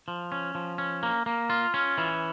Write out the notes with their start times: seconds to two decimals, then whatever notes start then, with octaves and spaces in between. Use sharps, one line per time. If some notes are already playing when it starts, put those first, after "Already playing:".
0.08 F3
0.32 C#4
0.55 F3
0.78 C#4
1.03 A#3
1.26 A#3
1.50 F4
1.74 C#4
1.98 E3